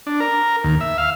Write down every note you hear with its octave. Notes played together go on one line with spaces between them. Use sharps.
D4
A#4
D#2
E5
F5